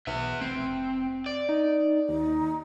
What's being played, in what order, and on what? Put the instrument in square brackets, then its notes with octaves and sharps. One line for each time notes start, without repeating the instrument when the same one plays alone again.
[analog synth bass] B1 [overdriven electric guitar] B3 E5
[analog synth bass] F1 [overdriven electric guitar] C4
[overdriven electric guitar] D5
[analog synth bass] D#4
[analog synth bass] D#2 [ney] D#4